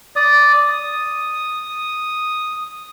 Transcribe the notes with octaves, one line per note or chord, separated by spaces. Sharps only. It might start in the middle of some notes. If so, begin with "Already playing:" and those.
D5 D#6
D#6